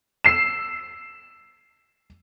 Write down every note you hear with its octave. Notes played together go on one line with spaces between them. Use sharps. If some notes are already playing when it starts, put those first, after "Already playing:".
E6 C7 E7